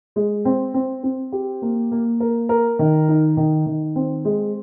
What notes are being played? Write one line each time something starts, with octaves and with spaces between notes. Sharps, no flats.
G#3
C4
C4
C4
G4
A#3
A#3
A#4
A#4
D#3
D#4
D#3
D#3
C4
G#3